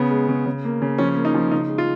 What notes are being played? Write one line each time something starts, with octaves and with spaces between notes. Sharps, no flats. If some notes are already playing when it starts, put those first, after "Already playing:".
Already playing: C#3 B3
G#3
C#3
C#3
A#3
C#3
F3 C#4
A#3
D#4
F3
C#3 D#4
G#3
F4